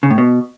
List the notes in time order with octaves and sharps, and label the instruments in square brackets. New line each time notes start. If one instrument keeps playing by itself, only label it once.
[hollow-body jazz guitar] C#3
A2
B2